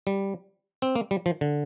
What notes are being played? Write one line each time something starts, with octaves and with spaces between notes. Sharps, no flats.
G3
C4
A#3
G3
F3
D3